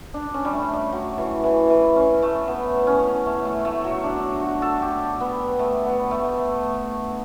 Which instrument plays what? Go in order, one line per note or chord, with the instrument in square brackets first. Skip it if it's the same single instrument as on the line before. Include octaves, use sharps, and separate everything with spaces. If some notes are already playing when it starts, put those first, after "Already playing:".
[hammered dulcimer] D4
C#4
G3
A3
G3
F#3
E3
E3
E3
C#4
A3
B3
C#4
A3
A3
A3
F#3
D4
F#4
A4
G4
B3
A3
B3
A3